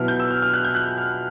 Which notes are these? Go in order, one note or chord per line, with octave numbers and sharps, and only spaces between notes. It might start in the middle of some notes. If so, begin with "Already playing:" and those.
Already playing: B2 F#3 B3 E4 F6
G6
E6
F6
F6
F#6
G6
F#6
F6